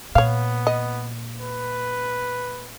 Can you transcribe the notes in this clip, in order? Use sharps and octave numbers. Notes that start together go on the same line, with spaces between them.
A#2 B3 C#5 F5
D#5
B4